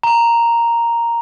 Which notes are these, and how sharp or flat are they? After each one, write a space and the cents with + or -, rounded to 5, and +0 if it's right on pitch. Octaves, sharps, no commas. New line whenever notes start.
A#5 +0